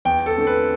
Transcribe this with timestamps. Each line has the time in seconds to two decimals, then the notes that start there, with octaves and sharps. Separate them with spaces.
0.05 E2 G5
0.26 A4
0.36 D3 A3 C4
0.47 B4